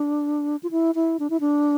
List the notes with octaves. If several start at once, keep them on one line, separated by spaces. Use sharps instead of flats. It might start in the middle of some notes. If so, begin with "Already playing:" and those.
Already playing: D4
F4
E4
E4
D4
E4
D4